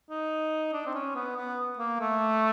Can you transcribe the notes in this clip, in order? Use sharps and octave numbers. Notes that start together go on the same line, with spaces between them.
D#4
D4
C4
C#4
B3
B3
A#3
A3